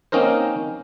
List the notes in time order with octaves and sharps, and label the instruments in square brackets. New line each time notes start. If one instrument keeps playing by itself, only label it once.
[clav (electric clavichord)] A#3 C4 C#4 D#4 A#4 C5